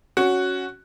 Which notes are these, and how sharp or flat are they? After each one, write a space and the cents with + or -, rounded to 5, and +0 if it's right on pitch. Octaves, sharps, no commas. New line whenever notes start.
C#4 +0 F#4 +0